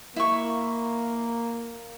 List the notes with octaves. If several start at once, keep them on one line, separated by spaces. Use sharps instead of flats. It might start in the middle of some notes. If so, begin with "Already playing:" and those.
A#3 E4 C#6